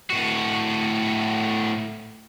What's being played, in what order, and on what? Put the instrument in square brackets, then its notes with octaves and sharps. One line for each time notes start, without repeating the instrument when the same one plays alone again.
[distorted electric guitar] A2 F#4